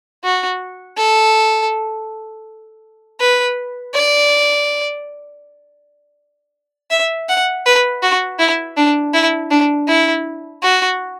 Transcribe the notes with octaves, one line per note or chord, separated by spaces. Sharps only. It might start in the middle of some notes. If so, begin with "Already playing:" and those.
F#4
A4
B4
D5
E5
F#5
B4
F#4
E4
D4
E4
D4
E4
F#4